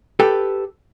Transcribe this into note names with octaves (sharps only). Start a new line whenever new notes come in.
G4 A4 B4 G5